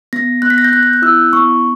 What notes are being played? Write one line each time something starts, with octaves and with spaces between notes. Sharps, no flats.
B3 A#6
B3 F#6
B6
A#6
G6
B3 F#6
G6
F#6
E4 E6
B3 C#6